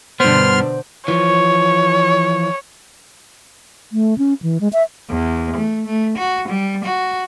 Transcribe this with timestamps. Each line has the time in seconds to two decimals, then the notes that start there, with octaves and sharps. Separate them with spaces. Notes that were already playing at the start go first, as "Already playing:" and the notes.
0.20 G2 B2 D3 B3 C5 C6 F6
1.08 E3 F3 C#5
3.92 A3
4.18 C#4
4.42 E3
4.61 G#3
4.73 E5
5.10 E2
5.57 A3
5.86 A3
6.18 F#4
6.48 G3
6.85 F#4